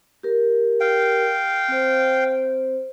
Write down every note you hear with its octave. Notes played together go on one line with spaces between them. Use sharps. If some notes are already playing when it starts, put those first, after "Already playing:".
G4 A#4
F5 G5
C4 C5